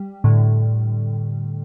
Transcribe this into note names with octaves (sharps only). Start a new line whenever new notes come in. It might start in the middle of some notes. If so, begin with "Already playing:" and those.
Already playing: G3
A2 D3